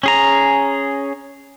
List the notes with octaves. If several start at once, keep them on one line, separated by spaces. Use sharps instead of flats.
C#4 G#4 A#5